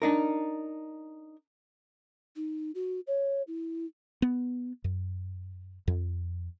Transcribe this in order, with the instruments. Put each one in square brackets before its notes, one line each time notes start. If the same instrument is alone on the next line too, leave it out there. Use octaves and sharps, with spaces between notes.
[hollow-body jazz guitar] D4 D#4 A#4
[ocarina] D#4
F#4
C#5
E4
[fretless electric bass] B3
F#2
F2